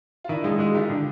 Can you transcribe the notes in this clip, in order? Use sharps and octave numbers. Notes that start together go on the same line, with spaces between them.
F4
D#3 D4 E4
G#3 D#4 F4
G#3 E4 F#4
D#3 F4 G4
D3